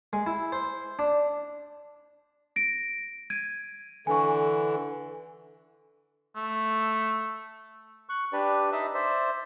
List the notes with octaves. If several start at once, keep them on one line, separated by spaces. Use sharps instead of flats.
G#3
E4
C5
D4
A#6 D7
G#6 D7 D#7
D3 E3 G#5 C#6
A3
C#6 F#6
D4 G4 B4 D5
D#4 D#5 E5 A5
C5 D5 E5